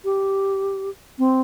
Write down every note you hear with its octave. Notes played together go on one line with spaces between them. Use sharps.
G4
C4